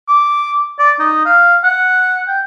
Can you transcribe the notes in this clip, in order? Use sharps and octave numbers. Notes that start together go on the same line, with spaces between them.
D6
D5
D#4
F5
F#5
G5